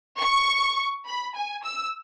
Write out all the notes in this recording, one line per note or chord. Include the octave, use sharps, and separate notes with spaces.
C#6
B5
G#5
E6